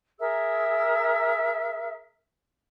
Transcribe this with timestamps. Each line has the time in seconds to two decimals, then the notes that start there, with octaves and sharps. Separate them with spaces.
0.19 G#4 A#4 E5 E6